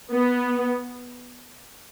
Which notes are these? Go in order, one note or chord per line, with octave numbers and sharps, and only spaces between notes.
B3